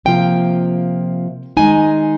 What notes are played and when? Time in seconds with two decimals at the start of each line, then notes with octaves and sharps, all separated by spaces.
0.05 C3 F3 A#3 F4 G5
1.57 D#3 G#3 D#4 G#5